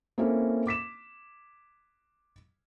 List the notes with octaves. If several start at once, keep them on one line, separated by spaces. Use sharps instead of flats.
A#3 C4 C#4 E4 A4
D6 B6 E7